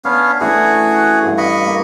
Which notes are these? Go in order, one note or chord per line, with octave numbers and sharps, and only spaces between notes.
B3 C#4 D4 F5
E3 A3 C#4 F#4 G#4
G2 F#5 C#6
D#5 F5 B5 C#6
A#3